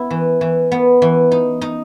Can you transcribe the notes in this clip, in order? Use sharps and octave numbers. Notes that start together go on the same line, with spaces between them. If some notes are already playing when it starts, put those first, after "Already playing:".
Already playing: B3 E4
E3
E3
B3
E3
D#4
D#4